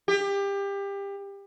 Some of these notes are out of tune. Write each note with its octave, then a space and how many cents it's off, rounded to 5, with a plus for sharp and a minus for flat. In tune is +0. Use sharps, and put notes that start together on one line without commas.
G4 +25